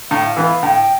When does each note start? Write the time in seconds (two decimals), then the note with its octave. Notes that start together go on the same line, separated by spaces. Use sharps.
0.11 A2 F5
0.37 E3 B3 F5
0.63 A2 G5